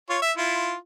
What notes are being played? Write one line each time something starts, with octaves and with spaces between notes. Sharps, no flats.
F4 C#5
E5
E4 F4